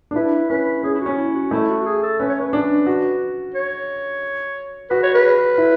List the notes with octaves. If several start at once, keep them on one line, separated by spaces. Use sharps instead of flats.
D4
E4 B4
C#4 B4
C#4 G#4
E4
F#4
C#4
E4
F#4
A3 E4
F#4
F#4
G#4
A4
C#4 B4
C#5
B4
D4
F#4
C#5
F#4 B4
C#5
B4
E4